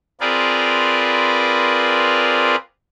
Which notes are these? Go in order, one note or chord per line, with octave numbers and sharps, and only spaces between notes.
C4 F4 G#4 A#4 B4 D5